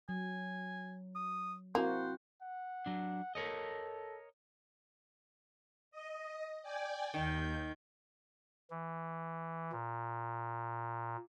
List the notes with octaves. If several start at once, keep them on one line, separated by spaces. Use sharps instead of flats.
F#3 G#5
D#6
A#3 C4 E4 F#4 C5
F#5
F#3 D4
A4 A#4 C#5 D#5
D#5
D5 G5 G#5
D#2 D#3 G6
E3
A#2